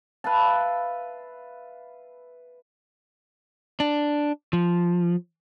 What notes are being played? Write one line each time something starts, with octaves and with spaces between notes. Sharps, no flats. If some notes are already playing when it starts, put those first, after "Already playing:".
B4 E5 F5 A5
D4
F3